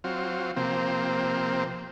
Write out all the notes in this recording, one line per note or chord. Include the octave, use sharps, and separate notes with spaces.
F#3 C4 F4
C3 F3 A#3 C4